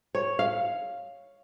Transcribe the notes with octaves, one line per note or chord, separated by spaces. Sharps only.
C#5
F5